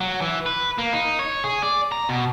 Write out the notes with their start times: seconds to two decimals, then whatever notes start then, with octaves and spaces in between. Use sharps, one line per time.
0.01 F#3
0.21 E3
0.46 B4
0.78 A#3
0.93 D#4
1.19 C#5
1.44 G#4
1.62 D5
1.92 A#5
2.09 B2